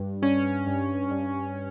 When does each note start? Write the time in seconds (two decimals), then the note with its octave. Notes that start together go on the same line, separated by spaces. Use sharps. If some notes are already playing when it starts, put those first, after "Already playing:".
Already playing: G2
0.22 G2 C#4
0.67 G2
1.11 G2